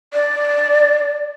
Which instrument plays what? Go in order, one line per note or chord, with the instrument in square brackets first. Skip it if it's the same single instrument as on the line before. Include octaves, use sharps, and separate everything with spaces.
[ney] D5